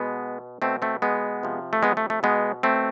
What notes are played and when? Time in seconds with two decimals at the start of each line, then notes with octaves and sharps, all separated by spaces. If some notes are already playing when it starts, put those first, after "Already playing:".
Already playing: B2 G#3 B3
0.62 B2 A3 C4
0.82 A3 C4
1.02 G#3 B3
1.43 C3 F3
1.73 A3
1.83 G#3 B3
1.97 A3
2.10 A3
2.23 B2 G#3 B3
2.63 A3 C4